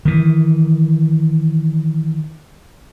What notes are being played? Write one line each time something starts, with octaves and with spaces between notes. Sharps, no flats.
D#3 E3